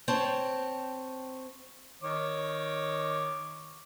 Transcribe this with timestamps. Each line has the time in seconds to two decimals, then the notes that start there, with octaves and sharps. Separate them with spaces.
0.08 C4 C5 C#5 G5 A5
2.03 D#3 C#5 D6